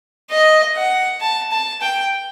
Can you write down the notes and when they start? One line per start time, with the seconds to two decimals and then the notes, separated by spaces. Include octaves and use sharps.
0.31 D#5
0.76 F#5
1.21 A5
1.52 A5
1.81 G5